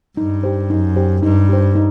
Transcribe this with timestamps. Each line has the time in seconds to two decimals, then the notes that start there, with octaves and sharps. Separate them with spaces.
0.17 G2 D#4
0.44 G4 C5
0.70 F#2 D#4
0.96 G4 C5
1.23 G2 D#4
1.49 G4 C5
1.75 D#4